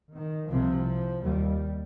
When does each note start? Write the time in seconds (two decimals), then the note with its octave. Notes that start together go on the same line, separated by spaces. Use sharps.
0.13 D#3
0.49 C2 C3 F3
1.23 D#2 G3